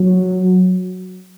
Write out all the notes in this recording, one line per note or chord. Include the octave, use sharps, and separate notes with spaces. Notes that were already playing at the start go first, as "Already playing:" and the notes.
Already playing: F#3